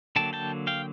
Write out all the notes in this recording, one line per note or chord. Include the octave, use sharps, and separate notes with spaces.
D3 F#3 A#3 G5 A5
G5 A5
F5 G5